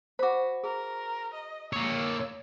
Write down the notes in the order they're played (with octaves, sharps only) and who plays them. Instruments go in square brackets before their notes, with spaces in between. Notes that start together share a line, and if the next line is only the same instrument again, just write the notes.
[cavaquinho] F#4 B5 [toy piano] C5 D6
[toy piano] G#4 [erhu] A#4
[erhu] D#5
[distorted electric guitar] A#3 C#5 [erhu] E6